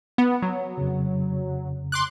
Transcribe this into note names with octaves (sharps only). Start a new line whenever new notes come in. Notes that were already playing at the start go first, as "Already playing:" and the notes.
B3
F#3
F2 C#3
C6 D6 F#6